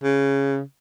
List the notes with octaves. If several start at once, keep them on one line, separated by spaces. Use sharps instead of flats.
C#3